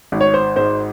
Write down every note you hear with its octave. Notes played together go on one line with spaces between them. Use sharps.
G#1
C#5
C5
G#2 C5